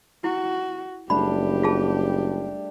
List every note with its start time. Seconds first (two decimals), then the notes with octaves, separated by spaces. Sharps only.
0.24 E4 F#4
1.10 F#1 G3 A3 D4 G4 B5
1.63 F4 G#4 A5